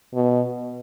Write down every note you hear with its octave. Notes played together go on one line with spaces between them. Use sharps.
B2